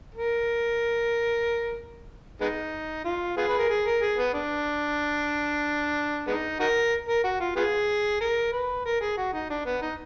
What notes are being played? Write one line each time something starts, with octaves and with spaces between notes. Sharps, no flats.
A#4
G#3 B3 D#4
F4
B3 F4 G#4
B4
A#4
G#4
A#4
G#4
B3
D4
G#3 B3 D#4
D#4 F#4 A#4
A#4
F#4
F4
B3 F4 G#4
A#4
B4
A#4
G#4
F#4
D#4
D4
B3
D#4